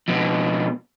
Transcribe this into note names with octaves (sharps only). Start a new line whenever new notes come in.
F2 B2